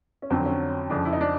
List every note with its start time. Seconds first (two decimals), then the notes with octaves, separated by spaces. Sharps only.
0.22 C#4
0.30 F2 D3 F#3 C4
0.45 C#4
0.90 F2 C#3 F3 D4
1.05 E4
1.13 D#4
1.21 D4